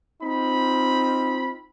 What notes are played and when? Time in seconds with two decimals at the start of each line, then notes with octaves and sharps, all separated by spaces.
0.22 C4 D#4 F4 B5